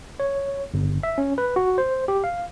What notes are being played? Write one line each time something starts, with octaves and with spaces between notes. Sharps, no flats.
C#5
G1
E5
C#4
B4
F#4
C5
G4
F5